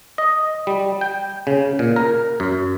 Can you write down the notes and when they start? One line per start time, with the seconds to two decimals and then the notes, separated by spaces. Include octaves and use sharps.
0.18 D#5
0.67 G3
1.01 G5
1.47 C#3
1.79 A#2
1.96 A#4
2.40 F#2